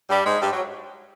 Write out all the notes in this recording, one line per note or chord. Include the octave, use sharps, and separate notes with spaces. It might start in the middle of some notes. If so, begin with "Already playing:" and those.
G2 G3
G#2 G#3
G2 G3
F#3